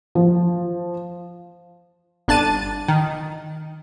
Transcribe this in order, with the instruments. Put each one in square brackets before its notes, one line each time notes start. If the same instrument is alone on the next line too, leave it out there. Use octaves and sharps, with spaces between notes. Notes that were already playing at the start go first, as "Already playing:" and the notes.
[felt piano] F3
[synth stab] G1 D4 A5 A6 D#7
D#3